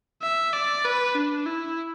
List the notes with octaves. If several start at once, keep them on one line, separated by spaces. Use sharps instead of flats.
E5
D5
B4
D4
E4